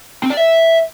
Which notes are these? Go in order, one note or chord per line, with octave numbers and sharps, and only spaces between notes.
C4
D5
E5